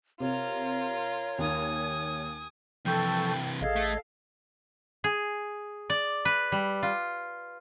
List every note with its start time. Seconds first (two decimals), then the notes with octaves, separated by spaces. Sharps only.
0.20 C3 F4 A#4 C#5
1.38 D#2 G#5 D#6
2.86 C3 E3 F3 A4 G5 C#6 G6
3.61 A1 G#4 A4 D#5 F5 G#6
3.76 A3
5.04 G#4
5.90 D5
6.25 B4
6.52 G3
6.83 F4